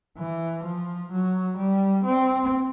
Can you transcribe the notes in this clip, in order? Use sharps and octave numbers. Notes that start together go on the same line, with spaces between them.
E3
F3
F#3
G3
C4